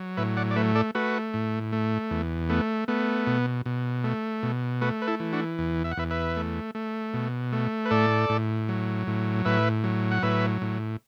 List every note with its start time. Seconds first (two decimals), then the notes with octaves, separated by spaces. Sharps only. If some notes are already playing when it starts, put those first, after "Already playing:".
Already playing: F#3
0.17 A2 B4 E5
0.37 D5 F#5
0.51 D5
0.56 A3 B4 E5
0.75 A4 D5
0.95 A3 F#4 B4
1.34 A2
1.73 A3
2.11 E2
2.49 A3 B3
2.88 A3 B3
3.27 B2
3.66 B2
4.04 A3
4.43 B2
4.81 A3 F#4 B4
5.02 B4
5.07 E4 A4
5.20 E3
5.33 D4 F#4
5.58 E2
5.84 E5
5.91 F#5
5.97 E2 B4 E5
6.10 B4 E5
6.36 A3
6.75 A3
7.14 B2
7.52 A3
7.85 B4
7.91 A2 A4 D5
8.29 A2
8.69 F#3
9.07 A2
9.45 A2 B4 E5
9.84 F#3
10.11 F#5
10.23 A2 B4 E5
10.62 A2